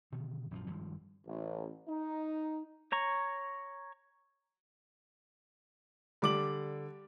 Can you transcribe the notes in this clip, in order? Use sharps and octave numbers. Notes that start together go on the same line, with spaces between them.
B2 D3 D#3
A#1 F#2 D#3 F3
G#1 G2 F3
A1
D#4
C#5 A#5 C#6
D3 G3 D6 F#7